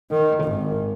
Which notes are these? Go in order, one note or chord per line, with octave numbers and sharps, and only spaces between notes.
D#3
G#1